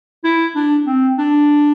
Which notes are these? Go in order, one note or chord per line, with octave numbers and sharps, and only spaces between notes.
E4
D4
C4
D4